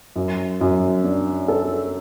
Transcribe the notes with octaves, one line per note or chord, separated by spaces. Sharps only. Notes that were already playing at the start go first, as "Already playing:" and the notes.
F#2
F#2
D4
A4